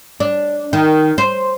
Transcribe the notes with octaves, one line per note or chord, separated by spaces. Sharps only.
D4
D#3
C5